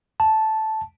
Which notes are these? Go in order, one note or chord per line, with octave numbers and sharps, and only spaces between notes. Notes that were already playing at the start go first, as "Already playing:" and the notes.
A5